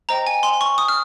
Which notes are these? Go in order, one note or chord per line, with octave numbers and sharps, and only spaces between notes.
C5 D#5 G5 A#5
G#5
C6
C#6
D#6
F6